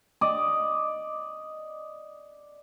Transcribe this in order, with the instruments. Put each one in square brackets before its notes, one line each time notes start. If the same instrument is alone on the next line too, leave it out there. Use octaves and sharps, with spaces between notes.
[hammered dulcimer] D5 D#5